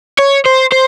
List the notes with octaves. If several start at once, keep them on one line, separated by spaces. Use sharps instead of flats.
C#5
C5
C5